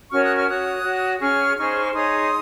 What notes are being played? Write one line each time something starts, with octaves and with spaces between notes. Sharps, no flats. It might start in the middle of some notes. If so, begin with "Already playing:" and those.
C#4 F#4 A#4 C#5 C#6 F6
D#6 F#6
C#6 F6
F#4 C#5 D#6 F#6
F#4 C#5
C#4 G#4 C#5 C#6 F6
D#4 G#4 C5 C#6 F6
D#4 G#4 C#5 C6 D#6